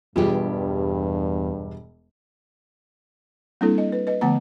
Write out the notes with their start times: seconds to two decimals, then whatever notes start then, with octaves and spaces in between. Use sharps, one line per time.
0.16 E1 E2 G2 G3 F4 G4 G#4
3.61 G3 A#3 C4 D4 E4 A4
3.78 D#5
3.92 B4
4.07 B4 D#5
4.21 D3 F3 A3 B3 F#5 A#5